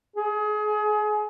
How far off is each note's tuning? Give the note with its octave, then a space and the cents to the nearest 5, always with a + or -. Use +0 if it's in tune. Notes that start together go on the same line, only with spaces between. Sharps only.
G#4 +30